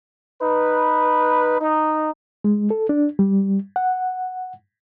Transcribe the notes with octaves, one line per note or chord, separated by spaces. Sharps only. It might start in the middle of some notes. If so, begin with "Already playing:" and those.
D#4 B4
D#4
G#3
A4
D4
G3
F#5